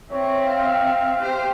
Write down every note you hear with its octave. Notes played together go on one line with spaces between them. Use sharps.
C4 C#5 E5
F5
G4 C5